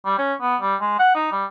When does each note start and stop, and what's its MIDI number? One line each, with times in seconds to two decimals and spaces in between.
0.06 0.15 55
0.18 0.34 61
0.41 0.56 59
0.61 0.76 55
0.81 0.98 56
0.99 1.11 78
1.15 1.27 63
1.32 1.45 55